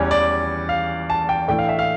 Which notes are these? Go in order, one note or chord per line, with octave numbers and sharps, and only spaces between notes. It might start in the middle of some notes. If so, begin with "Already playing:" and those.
Already playing: E2 E3 G3 C#4
D5
F5
A5
G5
A2 E3 A3 D4 G5
F5
E5
F5